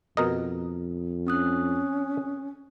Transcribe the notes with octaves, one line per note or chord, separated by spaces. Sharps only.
F2 B2 A#4 D#5
C4 C#4 D#6 F#6